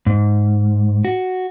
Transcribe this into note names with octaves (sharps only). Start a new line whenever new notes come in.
G#2
F#4